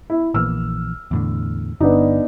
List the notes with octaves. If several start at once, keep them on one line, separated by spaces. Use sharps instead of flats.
E4
A#1 E3 A#3 E6 F6
E2 A2 D3
G1 B3 D4 D#4